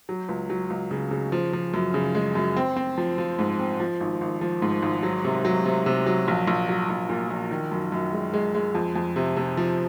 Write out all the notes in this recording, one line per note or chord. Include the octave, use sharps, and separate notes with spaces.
F#3
C#2
F#3
C#2
C#3
C#3
F3
F3
F#2
C#3
G#3
F#2
C4
C4
F3
F3
G#2
C4
F3
G#1
G#1
F3
G#2
G#1
F#3
C3
F#3
C3
C3
F#3
A#1
A#1
F#3
A#1
A#2
A#1
D#3
F#2
F#2
G#3
G#3
G#3
F2
F2
C3
C3
F3